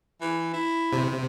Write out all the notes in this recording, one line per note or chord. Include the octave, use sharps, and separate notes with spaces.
E3
E4
C3